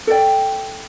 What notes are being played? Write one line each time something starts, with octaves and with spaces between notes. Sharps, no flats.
A4 D5 G5